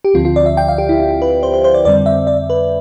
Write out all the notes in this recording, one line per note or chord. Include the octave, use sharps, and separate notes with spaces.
G4
D2 D3 F3 C4 F4
F4
D5
E5
G5
F5
G4
E4
E4
B4
C5
C5
C5
D5
F2 D3 G3 C4 D5
E5
D5
B4